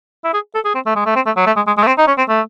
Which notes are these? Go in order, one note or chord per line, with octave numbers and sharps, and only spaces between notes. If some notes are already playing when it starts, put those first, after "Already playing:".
E4
G#4
A4
G#4
C4
A3
G#3
A3
C4
A3
F#3
A3
G#3
G#3
G#3
A3
C4
D#4
C#4
C4
A3